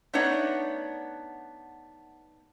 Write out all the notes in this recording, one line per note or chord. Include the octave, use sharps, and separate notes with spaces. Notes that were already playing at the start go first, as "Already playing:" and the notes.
A3 B3 D4 D#4 C#5 F#5